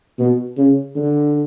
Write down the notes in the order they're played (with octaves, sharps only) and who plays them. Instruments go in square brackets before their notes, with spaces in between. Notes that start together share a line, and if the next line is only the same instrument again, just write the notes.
[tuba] B2
C#3
D3